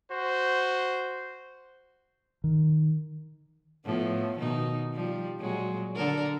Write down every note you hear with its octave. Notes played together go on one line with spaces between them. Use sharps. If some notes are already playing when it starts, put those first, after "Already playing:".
F#4 C5
D#3
A2 F3 B3
B2 D#3 D#4
F3 G3
A#2 F#3 G#3
D3 A4 A#4